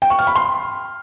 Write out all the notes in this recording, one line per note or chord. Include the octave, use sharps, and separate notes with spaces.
G5
C#6
F6
B5
C6